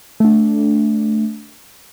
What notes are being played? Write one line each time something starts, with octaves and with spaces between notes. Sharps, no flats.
A3 D4